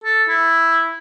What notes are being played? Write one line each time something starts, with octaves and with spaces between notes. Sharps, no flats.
A4
E4